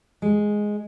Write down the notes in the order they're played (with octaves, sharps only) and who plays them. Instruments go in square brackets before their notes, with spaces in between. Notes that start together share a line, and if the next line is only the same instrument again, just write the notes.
[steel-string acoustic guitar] G#3